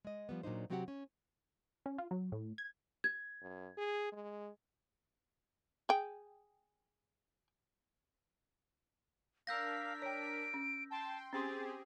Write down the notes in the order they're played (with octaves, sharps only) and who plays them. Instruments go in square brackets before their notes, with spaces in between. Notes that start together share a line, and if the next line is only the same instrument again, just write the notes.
[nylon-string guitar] G#3 D#5
F3 G3 B3
A#2 F#3 D4 D#4 C5
C3 F#3 C4 F#4 G4 F#5
C#4
[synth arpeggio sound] C#4
F4
F#3
A2
G#6
[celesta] G#6
[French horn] F#2
G#4
G#3
[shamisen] G#4 G5
[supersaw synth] D4 A#4 B6 [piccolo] F5 [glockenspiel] E6 G6 A#6
[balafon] C#5 G5 [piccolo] D7
[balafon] C#4
[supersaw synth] G5 C6 [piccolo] A5
[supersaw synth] C4 G4 G#4 [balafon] C#4 G5 C6 [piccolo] A6